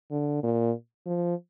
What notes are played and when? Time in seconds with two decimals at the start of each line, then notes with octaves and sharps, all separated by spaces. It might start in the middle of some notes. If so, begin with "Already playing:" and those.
0.11 D3
0.43 A#2
1.06 F3